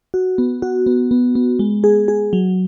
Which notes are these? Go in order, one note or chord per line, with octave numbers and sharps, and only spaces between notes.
F#4
B3
F#4
B3
B3
B3
G#3
G#4
G#4
F#3